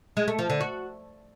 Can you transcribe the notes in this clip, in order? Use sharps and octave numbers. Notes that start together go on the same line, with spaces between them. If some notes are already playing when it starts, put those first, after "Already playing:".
G#3
A3
F3
D3
F#4